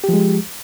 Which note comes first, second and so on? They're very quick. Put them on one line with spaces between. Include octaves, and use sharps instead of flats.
G4 F3 G#3